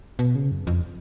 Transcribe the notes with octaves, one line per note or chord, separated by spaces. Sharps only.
B2
C#3
F#2
F2